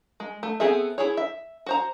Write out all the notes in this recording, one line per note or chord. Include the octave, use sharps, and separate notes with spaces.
G#3
A3
B3 C4 G#4 A4 E5
E4 G#4 C#5
E5
F#4 C5 A#5